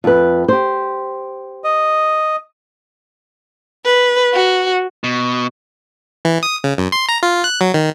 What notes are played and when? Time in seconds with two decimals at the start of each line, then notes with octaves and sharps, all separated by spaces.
0.04 F2 B4
0.48 G4 C5
1.64 D#5
3.85 B4
4.34 F#4
5.04 B2
6.25 E3
6.43 D#6
6.64 C#3
6.78 F#2
6.92 C6
7.09 A#5
7.23 F4
7.44 F#6
7.61 F#3
7.74 D#3